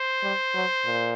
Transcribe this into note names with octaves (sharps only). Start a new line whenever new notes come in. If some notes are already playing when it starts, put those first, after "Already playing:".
Already playing: C5
G3
F#3
A#2